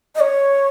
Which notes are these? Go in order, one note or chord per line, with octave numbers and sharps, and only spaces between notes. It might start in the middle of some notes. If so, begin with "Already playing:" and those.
D#5
C#5